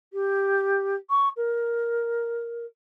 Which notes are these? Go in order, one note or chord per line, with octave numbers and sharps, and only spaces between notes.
G4
C#6
A#4